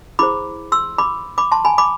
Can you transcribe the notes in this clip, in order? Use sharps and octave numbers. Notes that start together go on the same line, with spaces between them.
E4 G#4 C5 B5 D6
C6 E6
B5 D6
B5 D6
A5 C6
G#5 B5
B5 D6